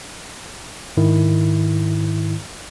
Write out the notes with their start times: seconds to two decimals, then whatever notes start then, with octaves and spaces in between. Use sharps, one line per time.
0.97 G#2 D#3 E4